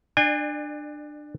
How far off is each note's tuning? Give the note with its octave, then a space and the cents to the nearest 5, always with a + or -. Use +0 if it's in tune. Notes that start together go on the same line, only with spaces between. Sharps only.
D4 +20 D5 +40 G#5 -35